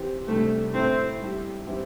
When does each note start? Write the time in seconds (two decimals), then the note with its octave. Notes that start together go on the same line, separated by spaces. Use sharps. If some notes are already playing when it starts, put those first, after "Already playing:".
Already playing: E3 C4 G4
0.28 C3 G3 A3 D4 G4
0.74 A2 A3 C4 E4
1.20 G3 E4 G4
1.67 E3 G3 C4 E4 G4